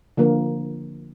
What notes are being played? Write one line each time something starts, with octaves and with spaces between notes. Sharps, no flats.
D3 F3 A#3